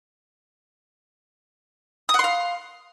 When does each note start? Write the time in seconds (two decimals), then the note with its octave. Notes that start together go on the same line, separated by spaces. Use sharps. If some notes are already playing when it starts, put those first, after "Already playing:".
2.09 D#6
2.14 F#5
2.19 C6
2.24 F5